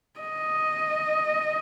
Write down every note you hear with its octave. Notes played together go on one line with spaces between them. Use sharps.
D#5